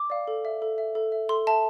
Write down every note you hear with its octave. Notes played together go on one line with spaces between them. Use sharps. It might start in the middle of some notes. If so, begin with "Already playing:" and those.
Already playing: D6
D5 F5
A4
E5
A4
E5
A4
E5
A4 C6
E5 A5